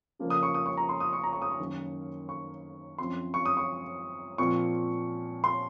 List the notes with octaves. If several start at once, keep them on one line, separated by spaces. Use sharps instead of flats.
C#3 F3 A#3
D#6
C#6
D#6
C#6
A#5
C6
D#6
C#6
A#5
C#6
D#6
C#6
F#2 D#3 F#3 A#3
C#6
F#2 F3 C4 C6
C#6
D#6
C#6
A#2 F3 C4 C#6
C6